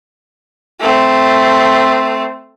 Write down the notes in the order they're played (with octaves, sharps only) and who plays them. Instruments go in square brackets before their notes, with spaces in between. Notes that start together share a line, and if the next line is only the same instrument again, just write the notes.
[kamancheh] A3 C4